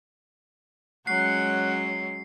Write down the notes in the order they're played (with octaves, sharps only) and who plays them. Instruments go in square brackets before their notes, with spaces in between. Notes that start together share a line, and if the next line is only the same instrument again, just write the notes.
[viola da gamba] F#3 G#3 C#4 [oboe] F#5 [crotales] C7